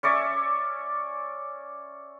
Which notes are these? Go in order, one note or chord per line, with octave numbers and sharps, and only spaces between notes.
C#4 C#5 D5 E5